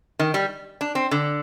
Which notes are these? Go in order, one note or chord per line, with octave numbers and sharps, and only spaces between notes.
D#3
G3
D4
C4
D3